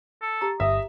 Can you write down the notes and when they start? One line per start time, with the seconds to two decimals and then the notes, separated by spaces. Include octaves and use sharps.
0.22 A4
0.41 G4 A#5
0.60 G1 D#5 E5